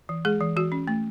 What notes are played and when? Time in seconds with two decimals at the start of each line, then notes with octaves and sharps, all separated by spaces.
0.09 E3
0.25 G#3 G#4
0.41 E3
0.56 E3 F#4
0.72 C#4
0.88 A3